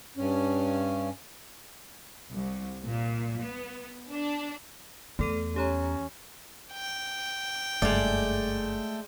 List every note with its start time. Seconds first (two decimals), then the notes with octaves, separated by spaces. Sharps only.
0.17 G2 C#4
2.30 C2
2.85 A#2
3.41 B3
4.12 D4
5.19 E2 A3 A4 D#7
5.56 C#4 G4 C#5 A#5
6.73 G5
7.82 F#1 G2 G#3 A3 D5